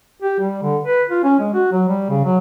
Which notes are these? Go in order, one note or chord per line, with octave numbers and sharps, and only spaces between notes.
G4
G3
D3
B4
F4
C#4
G#3
F#4
F#3
G3
C#3
F#3